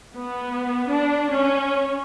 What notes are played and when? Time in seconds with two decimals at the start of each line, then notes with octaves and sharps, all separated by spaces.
0.15 B3
0.88 D4
1.31 C#4